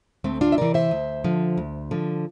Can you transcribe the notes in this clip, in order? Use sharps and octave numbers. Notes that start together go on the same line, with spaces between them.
D2 A3 C4
D4 F4
E5
C3 E3 A#4 D5
C5 E5
D2
D3 F3
D2
D3 F3